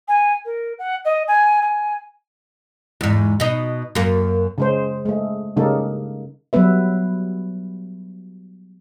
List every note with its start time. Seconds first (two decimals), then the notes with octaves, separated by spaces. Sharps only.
0.08 G#5
0.45 A#4
0.79 F#5
1.05 D#5
1.28 G#5
1.62 G#5
3.01 E2 G#2
3.40 B2 D#4
3.95 F#2 A#3
4.58 C#3 G#3 C5
5.06 G#3 A3
5.57 C#3 G3 G#3 A#3 D#4 A4
6.53 F#3 G3 B3 B4 E5